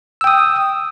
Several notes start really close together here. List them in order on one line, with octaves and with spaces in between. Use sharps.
E6 G5 D#6